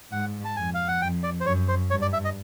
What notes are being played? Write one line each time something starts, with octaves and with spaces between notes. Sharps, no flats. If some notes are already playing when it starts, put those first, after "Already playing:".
G#2 F#5
A5
F2 G#5
F5
F#5
F2 G5
D5
C5
F#2 C#5
C5
G2 C#5
D5
E5
D#5